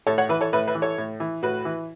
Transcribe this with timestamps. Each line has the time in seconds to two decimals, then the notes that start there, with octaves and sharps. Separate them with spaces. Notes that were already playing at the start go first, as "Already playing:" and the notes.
0.07 A2 A4 C#5
0.18 C#5 F#5
0.29 E3 B4 E5
0.41 A4 C#5
0.53 A2 B4 E5
0.68 B4 E5
0.75 E3
0.82 A4 C#5
0.98 A2
1.20 E3
1.43 A2 F#4 B4
1.65 E3